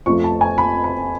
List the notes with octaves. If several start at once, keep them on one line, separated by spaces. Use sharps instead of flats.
F2 F3 A3 F4 C#6
A5
G#5
B5
B5